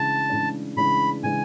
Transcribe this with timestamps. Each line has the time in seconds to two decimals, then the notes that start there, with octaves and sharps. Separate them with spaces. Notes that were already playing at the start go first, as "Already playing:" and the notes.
Already playing: C#3 E3 G#3 D4 A5
0.29 C#3 E3 G#3 D4
0.77 C#3 E3 G#3 D4 B5
1.23 C#3 E3 G#3 D4 G#5